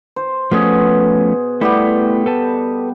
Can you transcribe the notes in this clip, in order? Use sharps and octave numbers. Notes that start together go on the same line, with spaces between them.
C5
B2 F3 A3 C#4 G#4
G3 A3 B3 E4 G4
A4 B4 A5